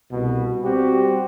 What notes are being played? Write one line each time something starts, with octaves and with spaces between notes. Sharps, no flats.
C2 B2
G3 C4 F#4 G4